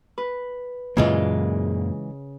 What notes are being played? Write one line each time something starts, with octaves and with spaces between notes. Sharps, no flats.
B4
F#2 A#2 C#3 E3 G#3 A#3 F4